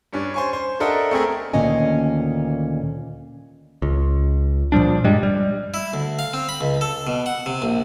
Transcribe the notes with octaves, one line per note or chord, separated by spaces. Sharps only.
G2 C#4 D4
C5 G#5 C#6
C5
D4 A4 A#4 D#5 E5 F#5
A3 C4 G#4 A#4
D2 A#2 D#3 C#4 D#5 G#5
C#2
A#2 F3 G3 D4
G2 G3 G#3
G3
E4
D2
F5
C4
B5
C#2
A4
B2
F#5
C3
A#1